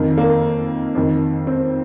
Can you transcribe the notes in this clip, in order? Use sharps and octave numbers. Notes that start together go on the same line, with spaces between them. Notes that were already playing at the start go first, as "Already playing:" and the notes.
Already playing: F2 D#3
A#3
F2 D#3
C4